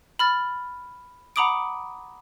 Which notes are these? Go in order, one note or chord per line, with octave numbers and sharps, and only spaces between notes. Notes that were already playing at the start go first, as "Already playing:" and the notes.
B5 F6 A6
F#5 A#5 B5 D6 D#6 D7